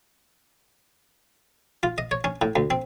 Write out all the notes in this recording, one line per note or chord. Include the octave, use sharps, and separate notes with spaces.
F4
D#5
C#5
C#4
A2
D2
C4